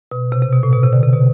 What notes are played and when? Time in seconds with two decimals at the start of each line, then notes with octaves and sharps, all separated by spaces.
0.11 B2
0.32 C3
0.42 C3
0.52 B2
0.63 A2
0.73 B2
0.83 C3
0.93 D3
1.03 C3
1.13 B2